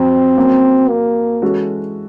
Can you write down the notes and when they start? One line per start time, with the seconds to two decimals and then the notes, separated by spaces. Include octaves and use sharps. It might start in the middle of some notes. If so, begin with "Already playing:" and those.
Already playing: F2 F#3 C4
0.37 F#3 A#3 C#4
0.89 A#3
1.42 E3 G#3 C#4 F#4 A4